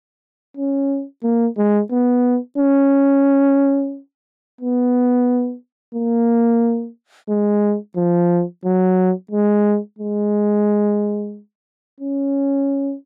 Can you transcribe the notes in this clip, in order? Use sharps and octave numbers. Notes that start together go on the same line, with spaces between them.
C#4
A#3
G#3
B3
C#4
B3
A#3
G#3
F3
F#3
G#3
G#3
C#4